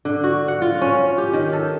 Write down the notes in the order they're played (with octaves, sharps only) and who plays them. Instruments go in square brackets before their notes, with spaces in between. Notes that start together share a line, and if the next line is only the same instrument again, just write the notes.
[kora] D3
F#4
F#5
F4
C#4
G4
D#3
A4